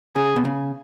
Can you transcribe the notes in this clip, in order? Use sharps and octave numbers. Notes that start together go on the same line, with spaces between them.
C#3 G#4
B2
C#3